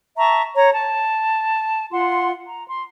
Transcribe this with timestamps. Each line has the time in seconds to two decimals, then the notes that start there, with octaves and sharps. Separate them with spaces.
0.18 E5 A5 A#5 C#6
0.56 C#5 A#5
0.72 A5
1.92 F4 F#5 C6
2.45 A#5
2.69 C6